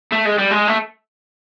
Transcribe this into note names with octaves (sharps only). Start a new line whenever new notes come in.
A3
G#3
G3
G#3
A3